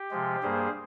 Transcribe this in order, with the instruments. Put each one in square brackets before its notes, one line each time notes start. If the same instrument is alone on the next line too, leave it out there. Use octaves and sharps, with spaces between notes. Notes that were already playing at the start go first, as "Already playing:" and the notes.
Already playing: [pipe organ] G4
C3 F3 G#3
G2 G3 A#3 G#4 C5